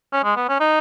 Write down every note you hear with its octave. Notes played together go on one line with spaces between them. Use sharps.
C#4
G#3
B3
C#4
D#4